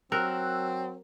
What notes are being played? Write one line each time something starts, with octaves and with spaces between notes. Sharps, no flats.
F#3 C4 A#4 E6 F#6